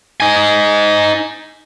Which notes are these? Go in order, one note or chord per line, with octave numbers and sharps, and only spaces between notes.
D#4 G#5